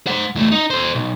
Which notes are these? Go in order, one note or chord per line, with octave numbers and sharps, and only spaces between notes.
C5 F#5
E2 A3
D#4
A4 C5
B1